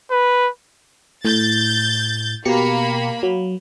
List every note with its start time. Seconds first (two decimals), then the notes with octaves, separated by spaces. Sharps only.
0.11 B4
1.25 A2 G6 A6
2.45 B2 A#3 G4 B5 C#7
3.23 F#3